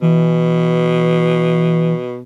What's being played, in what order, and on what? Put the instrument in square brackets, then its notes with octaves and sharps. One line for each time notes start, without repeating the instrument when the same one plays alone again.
[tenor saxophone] B2 [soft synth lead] E3